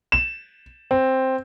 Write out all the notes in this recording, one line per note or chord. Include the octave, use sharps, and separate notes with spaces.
E7
C4